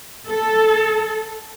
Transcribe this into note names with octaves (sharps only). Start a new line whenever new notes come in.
A4